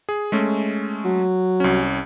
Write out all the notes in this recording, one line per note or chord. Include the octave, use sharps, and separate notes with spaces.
G#4
G#3 A3 C#4
F#3
C2 C#4